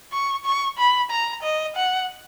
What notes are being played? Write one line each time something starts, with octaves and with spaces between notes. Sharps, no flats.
C#6
C#6
B5
A#5
D#5
F#5